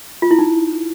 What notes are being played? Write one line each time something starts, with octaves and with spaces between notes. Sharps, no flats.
F4
E4
D#4